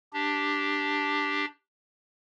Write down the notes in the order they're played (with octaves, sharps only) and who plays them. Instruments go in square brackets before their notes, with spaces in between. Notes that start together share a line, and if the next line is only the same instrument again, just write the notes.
[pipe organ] D4 G4